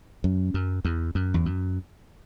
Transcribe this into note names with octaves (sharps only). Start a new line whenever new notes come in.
F#2
F#2
E2
F#2
E2
F#2